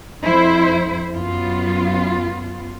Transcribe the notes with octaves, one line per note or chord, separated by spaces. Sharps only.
F2 E4 C5
F#2 B3 F4